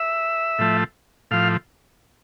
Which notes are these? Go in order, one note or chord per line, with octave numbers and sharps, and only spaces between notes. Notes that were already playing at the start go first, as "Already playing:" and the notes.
Already playing: E5
A2 F3 A3
A2 F3 F5